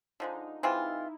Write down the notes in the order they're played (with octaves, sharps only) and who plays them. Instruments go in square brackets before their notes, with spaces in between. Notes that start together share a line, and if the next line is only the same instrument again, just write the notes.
[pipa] D3 F3 G#3 [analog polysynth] D#4
[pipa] E3 G#3 C4 F4 [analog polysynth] E4